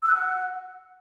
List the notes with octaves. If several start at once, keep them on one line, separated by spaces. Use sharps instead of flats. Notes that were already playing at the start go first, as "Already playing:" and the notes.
E6
F#6
F#5